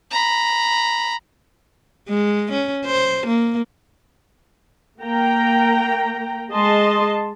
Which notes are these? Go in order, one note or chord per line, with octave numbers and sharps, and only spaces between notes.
A#5 B5
G#3
C#4
C5
A#3
A#3 G5 A#5
G#3 G#4 D#5 A5 C6